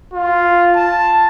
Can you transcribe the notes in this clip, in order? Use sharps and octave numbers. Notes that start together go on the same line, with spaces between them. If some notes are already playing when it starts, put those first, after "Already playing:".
F4
A5